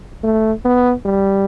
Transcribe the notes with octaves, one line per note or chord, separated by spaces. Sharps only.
A3
B3
G3